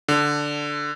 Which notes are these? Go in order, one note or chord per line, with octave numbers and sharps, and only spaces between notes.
D3